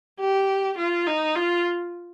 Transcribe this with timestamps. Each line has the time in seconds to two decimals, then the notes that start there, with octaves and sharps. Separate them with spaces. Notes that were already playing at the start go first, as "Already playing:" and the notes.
0.19 G4
0.78 F4
1.07 D#4
1.36 F4